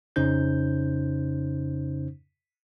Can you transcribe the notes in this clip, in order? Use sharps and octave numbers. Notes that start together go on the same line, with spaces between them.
F2 C#3 C#4 D#4 C5 G6